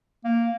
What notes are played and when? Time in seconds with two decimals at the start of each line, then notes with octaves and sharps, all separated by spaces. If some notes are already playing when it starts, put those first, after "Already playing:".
0.24 A#3